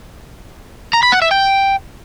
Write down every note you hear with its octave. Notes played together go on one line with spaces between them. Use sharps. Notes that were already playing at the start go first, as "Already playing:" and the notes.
A#5
B5
F#5
E5
G5